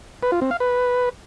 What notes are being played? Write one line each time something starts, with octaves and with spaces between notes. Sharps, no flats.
B4
F4
C4
F5
B4